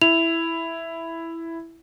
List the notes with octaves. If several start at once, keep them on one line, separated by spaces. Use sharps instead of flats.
E4 F7